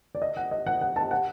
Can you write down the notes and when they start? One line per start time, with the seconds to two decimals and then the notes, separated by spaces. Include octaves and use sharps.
0.15 D5
0.22 D#5
0.37 F#5
0.51 D#5
0.66 F#5
0.81 F#5
0.96 A5
1.11 F#5